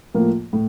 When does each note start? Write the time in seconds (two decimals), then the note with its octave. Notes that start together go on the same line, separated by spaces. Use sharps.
0.14 A2 F3 A#3
0.53 A2